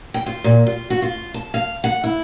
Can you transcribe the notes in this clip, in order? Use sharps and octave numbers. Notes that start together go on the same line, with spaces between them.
G5
F4
A#2
F4
F#4
F4
A5
F5
F#5
E4